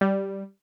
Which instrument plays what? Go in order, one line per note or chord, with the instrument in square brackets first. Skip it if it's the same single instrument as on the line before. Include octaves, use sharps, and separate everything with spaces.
[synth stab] G3